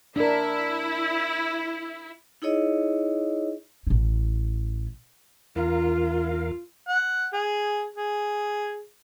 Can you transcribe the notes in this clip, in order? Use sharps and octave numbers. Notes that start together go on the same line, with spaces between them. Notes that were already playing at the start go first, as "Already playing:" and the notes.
D4 E4 A#4
D#4 E4 G#4 C#5 D#5
A1 E4
E2 F4 A#4 F5
F#5
G#4
G#4